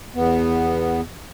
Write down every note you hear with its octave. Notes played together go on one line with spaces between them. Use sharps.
E2 B3